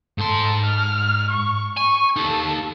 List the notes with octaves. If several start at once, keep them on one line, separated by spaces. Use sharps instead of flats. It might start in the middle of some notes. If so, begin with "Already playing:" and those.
G#2 A4 C6
F6
C#6
G#5 C#6
D#4 G4 A4